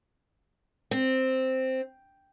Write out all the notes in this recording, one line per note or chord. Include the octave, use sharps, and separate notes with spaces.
C4